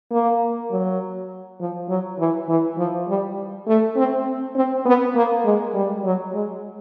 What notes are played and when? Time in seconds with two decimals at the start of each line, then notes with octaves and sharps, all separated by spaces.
0.11 A#3
0.71 F#3
1.60 F3
1.89 F#3
2.19 E3
2.48 E3
2.78 F3
3.08 G3
3.67 A3
3.96 C4
4.56 C4
4.86 B3
5.15 A#3
5.44 G#3
5.74 G3
6.04 F#3
6.33 G#3